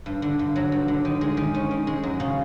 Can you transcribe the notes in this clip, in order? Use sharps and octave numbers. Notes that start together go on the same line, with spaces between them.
G2
D3
G2
F#3
G2
D3
D#3
G#3
D#3
C#4
D#3
G#3
F#2
C#3